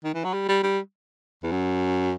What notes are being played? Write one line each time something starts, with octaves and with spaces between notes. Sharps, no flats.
D#3
E3
F#3
G3
G3
G3
E2
F#2